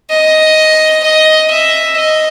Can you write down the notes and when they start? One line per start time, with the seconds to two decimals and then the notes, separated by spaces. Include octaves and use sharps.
0.10 D#5
1.03 D#5
1.50 E5
1.97 D#5